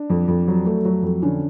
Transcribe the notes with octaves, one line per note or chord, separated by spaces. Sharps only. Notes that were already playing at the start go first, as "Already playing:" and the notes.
Already playing: D4
F2
F2
F#3
A3
F#3
F2
D3 C#4